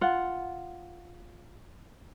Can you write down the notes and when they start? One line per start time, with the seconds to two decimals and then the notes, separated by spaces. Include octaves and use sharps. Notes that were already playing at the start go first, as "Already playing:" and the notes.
0.01 F4 F#5